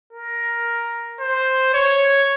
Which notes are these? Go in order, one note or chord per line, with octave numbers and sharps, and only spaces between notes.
A#4
C5
C#5